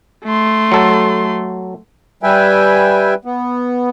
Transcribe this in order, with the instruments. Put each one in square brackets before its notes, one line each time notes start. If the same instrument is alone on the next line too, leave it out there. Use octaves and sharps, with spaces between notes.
[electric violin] A3 C6
[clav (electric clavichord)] F#3 A4
[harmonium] G3 B4 E5 G5 G#5
B3